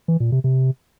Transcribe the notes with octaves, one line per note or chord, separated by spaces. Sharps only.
E3
A#2
C3
C3